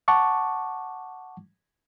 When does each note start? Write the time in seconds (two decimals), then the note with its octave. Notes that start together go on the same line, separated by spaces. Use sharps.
0.08 F#5 A5 C#6 D6